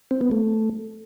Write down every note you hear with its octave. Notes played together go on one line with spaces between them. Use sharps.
C4
B3
A3